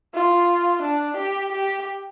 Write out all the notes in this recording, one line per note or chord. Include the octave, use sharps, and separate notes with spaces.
F4
D4
G4
G4